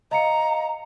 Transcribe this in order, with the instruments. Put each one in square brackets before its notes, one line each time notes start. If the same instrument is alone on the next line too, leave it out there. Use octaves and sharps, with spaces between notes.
[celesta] D#5 F5 C#7 [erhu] A#5